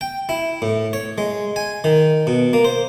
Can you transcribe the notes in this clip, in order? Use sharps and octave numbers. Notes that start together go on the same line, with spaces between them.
G5
E4
A2
C#5
G#3
G#5
D#3
B2
A#3
C5